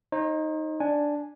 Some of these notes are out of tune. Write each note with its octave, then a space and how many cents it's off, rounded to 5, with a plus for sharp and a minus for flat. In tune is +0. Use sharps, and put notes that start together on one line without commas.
D#4 +0 C5 +45
D4 +0 G#5 +0